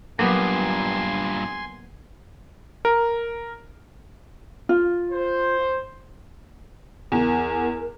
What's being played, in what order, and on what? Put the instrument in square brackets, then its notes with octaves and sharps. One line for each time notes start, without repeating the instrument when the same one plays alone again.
[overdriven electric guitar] G2 A#2 [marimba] F#3 [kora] A#3 B3 G4 [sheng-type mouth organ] G#5 C6
[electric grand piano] A#4
[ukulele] F4
[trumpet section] C5
[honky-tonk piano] E2 [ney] A#4